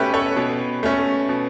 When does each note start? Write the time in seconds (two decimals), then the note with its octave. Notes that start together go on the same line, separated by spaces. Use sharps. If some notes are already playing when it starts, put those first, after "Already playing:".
Already playing: B2 A3 C#4 G4 A4 B4
0.14 A4 C#5
0.36 B2
0.83 A3 C#4
1.29 B2